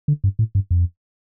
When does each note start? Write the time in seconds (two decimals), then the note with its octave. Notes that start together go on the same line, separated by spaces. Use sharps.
0.08 D3
0.24 G2
0.39 A2
0.55 G2
0.71 F2